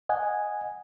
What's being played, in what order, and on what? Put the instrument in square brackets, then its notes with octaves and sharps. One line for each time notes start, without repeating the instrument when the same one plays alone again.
[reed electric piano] D#5 F#5 G#5